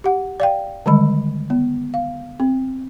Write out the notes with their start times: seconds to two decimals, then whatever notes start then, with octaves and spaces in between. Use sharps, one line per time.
0.04 G4 F#5
0.40 D5 F5 G5
0.86 D3 D#3 G3 G#3 B5
1.50 B3
1.94 F5
2.40 C4